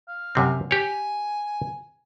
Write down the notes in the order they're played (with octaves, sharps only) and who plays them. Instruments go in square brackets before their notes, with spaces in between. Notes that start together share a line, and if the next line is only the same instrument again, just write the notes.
[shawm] F5
[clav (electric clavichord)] F#2 C3 C4
[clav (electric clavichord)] G4 C#5 [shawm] G#5